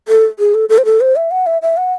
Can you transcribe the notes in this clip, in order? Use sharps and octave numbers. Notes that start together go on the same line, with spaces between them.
A4
G#4
A4
A4
C5
A4
C5
E5
F#5
E5
E5
F#5